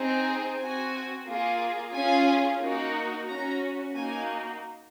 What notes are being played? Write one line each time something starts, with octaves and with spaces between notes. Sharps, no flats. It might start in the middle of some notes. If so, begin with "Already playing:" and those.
Already playing: C4 D#4 G#4
C4 F#4 G#5
A#3 F4 G#4
C#4 F4 G#4 G#5
A#3 D#4 F#4
C#4 F#4 A#5
A#3 D#4 F#4 G#5